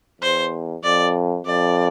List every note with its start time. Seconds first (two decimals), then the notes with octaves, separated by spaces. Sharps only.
0.22 E2 C5
0.84 F2 D5
1.45 F2 D5